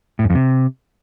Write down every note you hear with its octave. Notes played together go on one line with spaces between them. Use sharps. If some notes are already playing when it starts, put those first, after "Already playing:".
A2
F#2
F2
C3